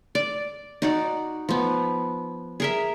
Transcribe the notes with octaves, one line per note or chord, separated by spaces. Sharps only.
D5
D#4 F#4 D5
F3 B3
G#4 A#4 E5